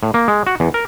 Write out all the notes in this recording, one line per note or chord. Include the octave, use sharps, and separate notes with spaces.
A2
A#3
G#3
F#4
E2
A#4